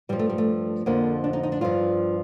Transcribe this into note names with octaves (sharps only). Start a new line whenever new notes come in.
G2 F3 G3
A3
G3
A3
F2 D3 F3 A#3
D4
D#4
D#4
D4
G2 F3 F4